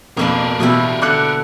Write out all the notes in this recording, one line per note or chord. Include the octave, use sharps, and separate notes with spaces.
F2 B2 A#3 D4 A#4 B4
B2 E3 G3 E4
D3 A4 D6 F#6 C#7